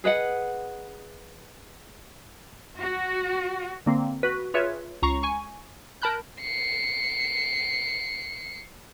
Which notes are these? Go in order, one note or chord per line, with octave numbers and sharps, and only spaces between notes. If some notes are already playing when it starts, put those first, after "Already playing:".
G#4 B4 D#5 F#5
F#4
D3 A#3 C4
F#4 B4
F4 G#4 B4 C#5 E5
C#2 A#5 C#6 C7
G#5 C#6
A#4 A5 B5 F#6 G6
C7 C#7